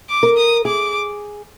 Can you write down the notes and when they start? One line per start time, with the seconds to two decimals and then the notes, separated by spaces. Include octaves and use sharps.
0.09 D6
0.23 A#4
0.37 D#6
0.65 G#4 D6